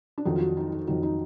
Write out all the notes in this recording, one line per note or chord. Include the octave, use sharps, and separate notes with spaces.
D4
F2 D#3 F#3 D#4
F4
F#4
D#4
D#4
F2 D#3 F#3 D#4
D#4